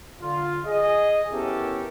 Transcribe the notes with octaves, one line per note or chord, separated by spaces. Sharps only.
D3 F4
G#4 D#5
B3 C#4 E4 G4 A4 A#4